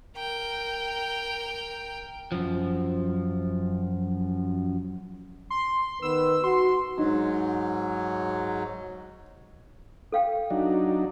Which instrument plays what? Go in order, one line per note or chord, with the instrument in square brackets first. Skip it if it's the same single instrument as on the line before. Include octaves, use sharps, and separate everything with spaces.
[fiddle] A#4 G5
[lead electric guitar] F#2 F3
[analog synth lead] C6
[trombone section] D#3 B3 B4 [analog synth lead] E6
[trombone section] F#4 [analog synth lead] C6
[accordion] G#2 F#3 [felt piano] D#4
[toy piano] A4 F5 G5
[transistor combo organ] F#3 D4 D#4